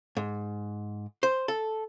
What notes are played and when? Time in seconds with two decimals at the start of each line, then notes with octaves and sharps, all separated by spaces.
0.17 G#2
1.23 C5
1.48 A4